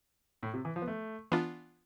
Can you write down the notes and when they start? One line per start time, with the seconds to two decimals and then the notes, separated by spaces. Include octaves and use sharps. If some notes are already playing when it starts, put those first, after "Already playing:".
0.43 A2
0.54 C3
0.65 E3
0.76 F3
0.82 B3
0.88 A3
1.32 E3 B3 D4 F4